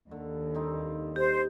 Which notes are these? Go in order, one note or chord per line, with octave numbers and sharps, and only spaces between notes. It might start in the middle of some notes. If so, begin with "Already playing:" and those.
D#2 D3
G3 C4 D#4
G4 C5